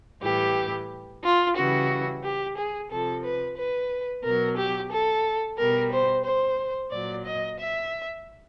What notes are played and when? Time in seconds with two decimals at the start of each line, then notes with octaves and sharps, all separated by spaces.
0.23 A2 E3 G3 G4
1.23 F4
1.57 C#3 E3 G3 F#4
2.24 G4
2.57 G#4
2.90 C3 F3 A4
3.24 B4
3.57 B4
4.24 B2 F#3 A#4
4.57 G4
4.91 A4
5.57 B2 G3 A#4
5.91 C5
6.25 C5
6.91 A#2 F#3 D5
7.25 D#5
7.58 E5